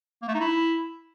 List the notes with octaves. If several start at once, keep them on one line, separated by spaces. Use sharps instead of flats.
A#3
A3
D#4
E4